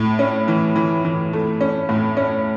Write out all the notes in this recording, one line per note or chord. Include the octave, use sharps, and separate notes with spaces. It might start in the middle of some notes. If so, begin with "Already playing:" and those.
Already playing: A2
C#4
E3
E3
E3
A3
C#4
A2
C#4